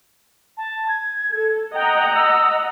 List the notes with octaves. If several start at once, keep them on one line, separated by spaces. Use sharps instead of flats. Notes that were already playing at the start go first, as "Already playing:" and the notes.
A5
G#6
A4
D#5 F#5 G5 A#5
E6